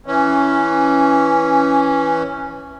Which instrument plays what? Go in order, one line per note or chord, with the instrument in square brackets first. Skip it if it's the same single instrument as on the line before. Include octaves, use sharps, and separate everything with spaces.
[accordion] E3 C#4